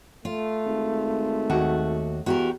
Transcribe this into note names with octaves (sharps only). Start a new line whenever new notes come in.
A3 F4
G#1
D#2 F#4 F#5
E2 F#4 G4 A#4